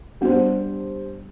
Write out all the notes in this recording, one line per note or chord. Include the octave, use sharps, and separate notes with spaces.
G3 B3 D4 G4 C5